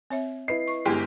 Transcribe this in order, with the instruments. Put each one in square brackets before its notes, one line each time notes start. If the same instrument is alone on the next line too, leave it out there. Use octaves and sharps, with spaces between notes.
[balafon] C4 C#5 E5
[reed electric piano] E4 B4 D#5 [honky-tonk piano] C7
[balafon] C#6
[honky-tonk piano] G1 G#3 G4 [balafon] B3 E4